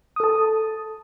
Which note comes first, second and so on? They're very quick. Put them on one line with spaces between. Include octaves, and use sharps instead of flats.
D#6 A4 A5